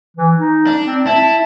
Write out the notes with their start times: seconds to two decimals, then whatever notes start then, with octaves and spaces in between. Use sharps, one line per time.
0.17 E3
0.37 D#4
0.67 D4
0.86 C4
1.07 E4 A5